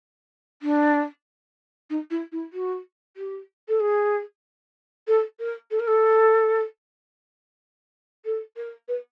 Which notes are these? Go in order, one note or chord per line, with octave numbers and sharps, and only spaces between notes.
D4
D#4
E4
E4
F#4
G4
A4
G#4
A4
A#4
A4
A#4
A4
A4
A#4
B4